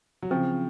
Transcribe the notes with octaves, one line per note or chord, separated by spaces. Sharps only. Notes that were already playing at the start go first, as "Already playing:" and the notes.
F#3
C#3 F3 C4